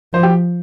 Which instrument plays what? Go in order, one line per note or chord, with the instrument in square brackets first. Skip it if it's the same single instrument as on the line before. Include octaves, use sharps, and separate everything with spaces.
[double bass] F3 [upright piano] C5
[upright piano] G4